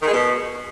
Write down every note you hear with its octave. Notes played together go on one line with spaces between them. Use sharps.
D#3
G#3
B2